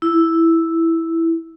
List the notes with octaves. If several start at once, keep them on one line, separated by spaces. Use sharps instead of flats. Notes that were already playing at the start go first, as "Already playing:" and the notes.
E4